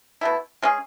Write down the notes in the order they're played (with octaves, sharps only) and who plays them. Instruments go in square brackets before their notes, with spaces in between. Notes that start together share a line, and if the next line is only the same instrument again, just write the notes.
[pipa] B2 A3 E4
G#3 C#4 G#4